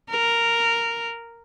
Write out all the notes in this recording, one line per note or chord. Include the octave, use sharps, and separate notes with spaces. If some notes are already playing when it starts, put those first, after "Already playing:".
A#4